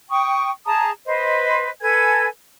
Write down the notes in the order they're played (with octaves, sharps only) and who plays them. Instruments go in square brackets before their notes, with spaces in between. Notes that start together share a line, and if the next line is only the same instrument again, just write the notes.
[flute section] G5 C#6 D#6
G#4 A5 A#5 D#6
B4 C5 D#5
A4 B4 G#5 G#6